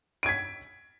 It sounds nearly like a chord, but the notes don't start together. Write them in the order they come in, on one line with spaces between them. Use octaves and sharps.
D7 G#6 B6